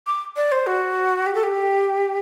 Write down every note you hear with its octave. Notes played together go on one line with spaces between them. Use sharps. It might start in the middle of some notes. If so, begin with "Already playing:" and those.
D6
D5
C5
F#4
G4
A4
G4